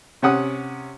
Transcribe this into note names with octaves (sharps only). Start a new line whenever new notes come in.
C3 C#4 F#5 D#6